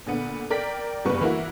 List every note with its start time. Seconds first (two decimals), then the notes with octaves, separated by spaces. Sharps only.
0.07 A#2 D3 B3
0.50 A#4 D5 G5 B6
1.05 F#1 G2 B3 B4 C#6
1.21 E3 A#3 E4 F#4